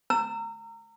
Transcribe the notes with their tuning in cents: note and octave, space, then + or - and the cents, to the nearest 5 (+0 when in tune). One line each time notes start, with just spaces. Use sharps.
A#5 -25 E6 +30